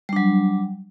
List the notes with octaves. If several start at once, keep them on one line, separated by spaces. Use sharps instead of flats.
F#3 G3 D4